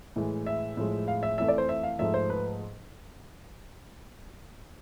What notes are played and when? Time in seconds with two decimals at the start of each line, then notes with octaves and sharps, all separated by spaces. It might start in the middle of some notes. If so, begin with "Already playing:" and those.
0.16 A2 E3 G#3
0.47 E5
0.77 A2 F3 G#3
1.08 F5
1.23 E5
1.38 F2 E3 A3 E5
1.48 D5
1.58 C5
1.69 E5
1.83 F5
1.99 G#2 F3 A3 E5
2.14 C5
2.30 B4